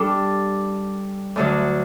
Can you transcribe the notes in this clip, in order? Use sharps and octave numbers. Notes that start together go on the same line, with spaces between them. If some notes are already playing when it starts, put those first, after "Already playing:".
Already playing: G3 D4 A4
D2 D3 F#3